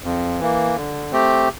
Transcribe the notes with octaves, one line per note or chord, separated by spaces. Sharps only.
F2
E3 A#3
D3
A3 C4 G4